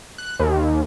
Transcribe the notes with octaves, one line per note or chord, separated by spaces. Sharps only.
F#6
D#2